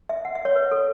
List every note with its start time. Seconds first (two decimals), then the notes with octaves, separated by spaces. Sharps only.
0.09 E5
0.25 F#5
0.35 E5
0.45 C#5
0.56 B4
0.72 A4